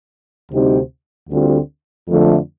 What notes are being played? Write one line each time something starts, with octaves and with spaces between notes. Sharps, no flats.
D2 C3 G3 C4 D#4
D2 D3 G3 C4 F4
F2 D3 F3 A3